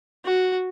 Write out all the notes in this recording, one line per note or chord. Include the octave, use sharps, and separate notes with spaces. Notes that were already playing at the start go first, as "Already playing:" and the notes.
F#4